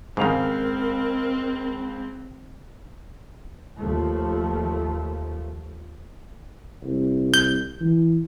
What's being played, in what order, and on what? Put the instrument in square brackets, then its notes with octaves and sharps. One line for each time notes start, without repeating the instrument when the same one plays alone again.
[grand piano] C#2 F5 F7 [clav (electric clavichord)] G#2 D#3 [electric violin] C4 [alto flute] A#4
[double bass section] D#2 F3 A3
[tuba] C2
[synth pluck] G6
[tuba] E3